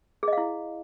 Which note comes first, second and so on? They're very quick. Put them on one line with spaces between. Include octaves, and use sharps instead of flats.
G#4 D#5 F5 E4